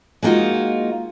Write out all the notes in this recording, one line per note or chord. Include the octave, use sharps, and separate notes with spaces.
G#3 A#3 B3 D#4 F4 F#4